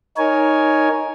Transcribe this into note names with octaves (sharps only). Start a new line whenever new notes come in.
D#4 A#4 C#5 G#5